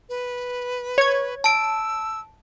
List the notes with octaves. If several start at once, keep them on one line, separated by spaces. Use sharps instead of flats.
B4
C#5 G#6
A5 E6 D7